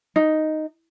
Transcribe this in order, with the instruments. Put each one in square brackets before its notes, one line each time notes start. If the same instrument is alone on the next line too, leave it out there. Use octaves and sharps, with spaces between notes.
[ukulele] D#4